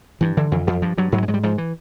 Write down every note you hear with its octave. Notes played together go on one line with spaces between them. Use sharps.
G2 E3
D3 E3
F2 E3
F2 F3
G2 F3
G2 F#3
G#2 F#3
G#3
G#2 F#3
G3
G#2 F3
E3